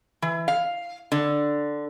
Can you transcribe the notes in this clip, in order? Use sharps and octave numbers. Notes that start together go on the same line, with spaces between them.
E3
F5
D3